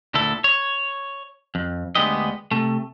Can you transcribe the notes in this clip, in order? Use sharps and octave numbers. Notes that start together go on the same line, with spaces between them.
D2 A#2 E4 A4
C#5
F2
D2 G#3 B3 D4 G4 D#5
C3 A3